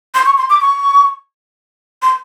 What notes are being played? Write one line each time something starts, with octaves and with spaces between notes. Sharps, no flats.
C6
C#6
C6
D6
C#6
C6